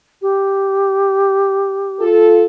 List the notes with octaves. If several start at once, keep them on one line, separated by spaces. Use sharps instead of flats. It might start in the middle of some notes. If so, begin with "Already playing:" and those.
G4
F4 A4